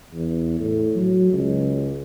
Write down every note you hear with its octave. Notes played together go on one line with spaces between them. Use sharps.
E2
A2
F#3
C#2